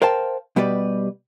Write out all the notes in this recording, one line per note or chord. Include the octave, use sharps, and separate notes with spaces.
A#4 C5 F5 G5 A5
B2 G3 G4 B4 D5